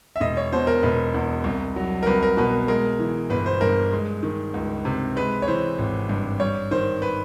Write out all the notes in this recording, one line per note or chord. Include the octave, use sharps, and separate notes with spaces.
E5
E1 D#5
C#5
B2 C5
A#4
E1 B4
E2
C2
F#3
A#4
C2 B4
A#4
B2 B4
G#3 A#4
E3
G1 B4
C5
G2 A#4
G#3
D#3
C#2
C3
G#3 B4
C#5
E3 C5
G#1
G2
G3 C#5
D#3 C5
B4